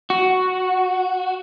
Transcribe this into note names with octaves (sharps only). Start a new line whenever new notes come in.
F#4